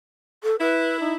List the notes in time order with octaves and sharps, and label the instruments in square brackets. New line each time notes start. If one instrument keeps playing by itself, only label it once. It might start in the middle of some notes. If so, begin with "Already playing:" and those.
[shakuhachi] A4
[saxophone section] E4 [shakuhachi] B4
[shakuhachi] D#4